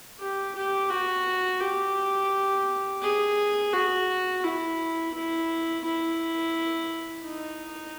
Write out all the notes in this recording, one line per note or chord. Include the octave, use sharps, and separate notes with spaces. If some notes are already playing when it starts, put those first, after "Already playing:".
G4
G4
F#4
G4
G#4
F#4
E4
E4
E4
D#4